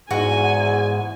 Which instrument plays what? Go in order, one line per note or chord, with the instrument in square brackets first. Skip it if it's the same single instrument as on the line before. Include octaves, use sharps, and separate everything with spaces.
[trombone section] E2 [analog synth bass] G#2 [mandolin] F#4 [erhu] G#5